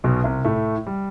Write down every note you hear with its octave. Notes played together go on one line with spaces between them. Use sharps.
B1 B2
C2 C3
A2 A3
G3